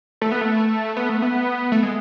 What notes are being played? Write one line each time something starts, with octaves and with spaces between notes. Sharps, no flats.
A3
B3
A3
B3
A3
B3
A3
G#3